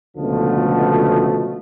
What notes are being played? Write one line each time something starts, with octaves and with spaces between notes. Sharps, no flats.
C#2 B2 D3 F3 A3 B3